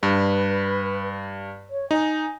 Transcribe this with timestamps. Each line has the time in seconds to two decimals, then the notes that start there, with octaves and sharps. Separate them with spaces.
0.03 G2 B4
1.70 C#5
1.91 D#4 G#5